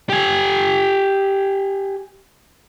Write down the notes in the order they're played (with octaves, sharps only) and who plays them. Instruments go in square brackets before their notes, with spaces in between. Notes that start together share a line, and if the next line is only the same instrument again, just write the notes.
[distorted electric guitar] G4 G#5